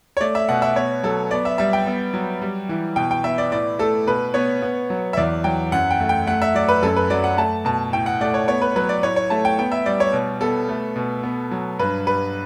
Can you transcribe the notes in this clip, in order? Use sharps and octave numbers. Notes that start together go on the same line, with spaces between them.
C#5
A3 D5
E5
B2 F#5
E5
B3 C#5
F#3 A4
B3 D5
E5
G3 E5
G5
B3
F#3
G3
E3
B2 G5
G5
B3 E5
D5
A2 D5
A3 A4
B2 B4
B3 C#5
B3
F#3
E5
E2 D5
F#3 G5
F#2 F#5
G5
A3
G5
A3 F#5
E5
F#3 D5
B4
F#2 A4
B4
F#3 D5
F#5
A3 A5
B2 A5
A2 G5
F#5
A3 D5
C#5
B3 C#5
B4
F#3 B4
D5
A2 C#5
C#5
A3 A5
G5
B3 G5
E5
G3 D5
C#5
B2
B3 A4
A3
B2
B3
F#3
G2 B4
G3 B4